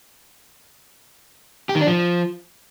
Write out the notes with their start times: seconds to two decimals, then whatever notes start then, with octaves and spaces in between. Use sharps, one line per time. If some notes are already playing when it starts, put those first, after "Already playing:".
1.69 G4
1.75 D#3
1.81 D4
1.87 F3